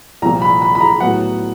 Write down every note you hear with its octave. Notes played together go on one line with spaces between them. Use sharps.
C2 A#2 F3 A#5
B5
B5
B5
A#5
A2 F#3 B3 F#5